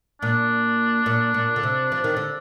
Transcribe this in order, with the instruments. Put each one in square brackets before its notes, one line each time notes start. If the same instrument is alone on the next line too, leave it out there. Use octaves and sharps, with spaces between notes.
[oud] A#2 [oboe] D4
[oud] A#2
A#2
D3
C3
F3
D#3
D3